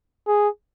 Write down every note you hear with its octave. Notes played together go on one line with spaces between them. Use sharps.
G#4